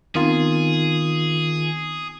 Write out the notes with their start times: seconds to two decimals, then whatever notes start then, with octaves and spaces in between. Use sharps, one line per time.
0.15 D#3 B3 C4 D#4 F4 G#4